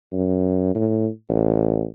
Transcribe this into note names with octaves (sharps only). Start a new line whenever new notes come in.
F#2
A2
A1